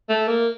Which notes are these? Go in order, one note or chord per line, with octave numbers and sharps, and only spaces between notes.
A3
A#3